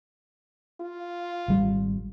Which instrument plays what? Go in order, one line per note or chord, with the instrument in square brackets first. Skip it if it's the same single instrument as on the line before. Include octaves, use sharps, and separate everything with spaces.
[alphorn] F4
[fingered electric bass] G#1 G3